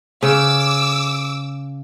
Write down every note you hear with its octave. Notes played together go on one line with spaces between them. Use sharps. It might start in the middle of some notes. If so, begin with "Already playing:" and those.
C#3 D6 E6